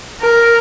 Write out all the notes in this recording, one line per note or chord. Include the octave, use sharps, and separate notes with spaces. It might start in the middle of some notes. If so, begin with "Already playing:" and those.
A#4